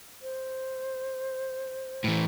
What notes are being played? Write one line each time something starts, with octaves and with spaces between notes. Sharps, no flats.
C5
A2 E3